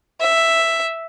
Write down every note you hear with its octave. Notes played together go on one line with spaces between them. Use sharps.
E5